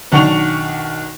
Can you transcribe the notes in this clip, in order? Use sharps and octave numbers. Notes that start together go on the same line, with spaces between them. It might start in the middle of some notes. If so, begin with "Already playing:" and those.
B1 D#3 D4 F#5 C#6 F7